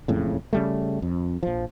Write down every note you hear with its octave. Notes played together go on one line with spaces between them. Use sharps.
E1 F2 A2 C#3
C#3 G3 A3
F2
A#1 F3